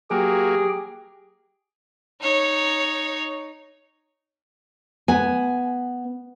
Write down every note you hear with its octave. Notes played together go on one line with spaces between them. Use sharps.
F#3 A#3 G4 G#4 G5
D#4 C#5
B3 G#5